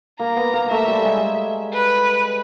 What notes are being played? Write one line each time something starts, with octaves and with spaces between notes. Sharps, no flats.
A#3 A#5
B3
A#3
A3 E5
G3
G#3
B4